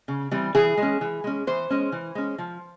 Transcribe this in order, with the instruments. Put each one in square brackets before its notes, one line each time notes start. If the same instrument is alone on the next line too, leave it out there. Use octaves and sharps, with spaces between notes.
[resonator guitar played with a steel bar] C#3
E3 G3 C4
E3 G#4
G#3 C#4
E3
G#3 C#4
E3 C5
G#3 C#4
E3
G#3 C#4
F3